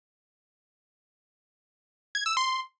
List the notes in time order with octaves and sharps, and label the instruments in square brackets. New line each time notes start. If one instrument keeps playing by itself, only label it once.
[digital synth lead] G#6
E6
C6